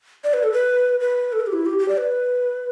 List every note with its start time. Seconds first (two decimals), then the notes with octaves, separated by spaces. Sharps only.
0.24 D5
0.34 B4
0.43 A4
0.52 B4
1.00 B4
1.33 A4
1.40 B4
1.47 G4
1.53 E4
1.66 G4
1.79 G4
1.88 D5
1.98 B4